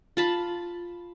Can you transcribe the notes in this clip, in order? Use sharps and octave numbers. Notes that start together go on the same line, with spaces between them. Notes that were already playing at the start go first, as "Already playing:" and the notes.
F4 A5 B5